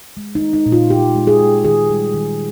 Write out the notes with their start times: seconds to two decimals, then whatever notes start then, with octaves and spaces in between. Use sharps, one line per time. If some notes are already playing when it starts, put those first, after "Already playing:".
0.17 G#3
0.35 D#4
0.41 G#3
0.53 D#4
0.66 A#2
0.72 F4
0.90 A#2 G4
1.15 G#3
1.27 G#4
1.40 G#3
1.65 D#3 G#4
1.90 G3
2.14 D#3